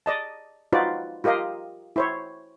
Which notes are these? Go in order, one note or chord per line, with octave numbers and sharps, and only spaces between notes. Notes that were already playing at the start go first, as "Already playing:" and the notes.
D5 D#5 A5
D#4 F4 F#4 B4 C5 D5
F4 G4 A#4 D#5 F5
E4 C5 C#5